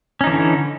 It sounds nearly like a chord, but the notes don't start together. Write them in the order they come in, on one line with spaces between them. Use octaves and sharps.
C#4 D#4 E3 D3